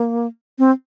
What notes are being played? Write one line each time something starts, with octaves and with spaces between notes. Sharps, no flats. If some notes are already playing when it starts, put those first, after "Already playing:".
Already playing: A#3
C4